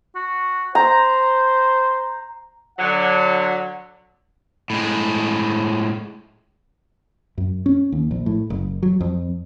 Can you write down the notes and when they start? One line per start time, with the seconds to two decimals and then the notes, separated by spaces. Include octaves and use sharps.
0.15 F#4
0.75 C5 A#5
2.79 D3 F#3 F#5
4.70 A2 G#3
7.38 F#2
7.66 C#4
7.92 D#2
8.11 A#1
8.26 A2
8.50 F#1
8.83 F#3
9.00 F2